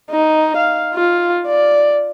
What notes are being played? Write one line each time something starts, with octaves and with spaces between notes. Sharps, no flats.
D#4
F5
F4
D5